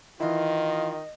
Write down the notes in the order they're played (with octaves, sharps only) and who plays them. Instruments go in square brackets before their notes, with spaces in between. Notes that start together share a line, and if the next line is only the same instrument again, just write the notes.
[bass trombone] D#3 [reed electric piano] E3 E4 [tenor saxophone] F4 [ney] D#5